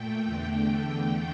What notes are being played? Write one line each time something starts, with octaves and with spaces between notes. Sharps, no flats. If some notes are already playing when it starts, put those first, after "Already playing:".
Already playing: A#2 A3 G5
E2 D3 A3